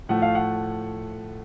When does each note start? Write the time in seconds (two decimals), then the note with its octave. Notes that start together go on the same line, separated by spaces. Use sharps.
0.09 A2 F3 A3 F#5
0.22 F5
0.35 F#5